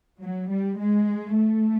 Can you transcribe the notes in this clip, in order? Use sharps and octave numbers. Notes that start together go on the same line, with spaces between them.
F#3
G3
G#3
A3